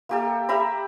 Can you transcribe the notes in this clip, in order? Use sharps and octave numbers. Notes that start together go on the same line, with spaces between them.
A#3 G4 A4
G4 E5 A#5 B5